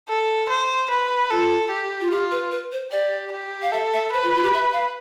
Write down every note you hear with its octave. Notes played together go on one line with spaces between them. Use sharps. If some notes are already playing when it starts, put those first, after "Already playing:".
A4
C5
B4
F4 A4
G4
F4
F4 G4
B4
B4
C5
G4 D5
G4
F5
A4 E5
E5
B4 C5
F4
F4
G4
E5
F5